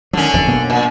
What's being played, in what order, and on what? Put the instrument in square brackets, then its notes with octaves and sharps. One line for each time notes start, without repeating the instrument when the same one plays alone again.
[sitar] D3 C#4 [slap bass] D#3 F#3
[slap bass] F#1 F2 E3
B2 A#3
[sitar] A#2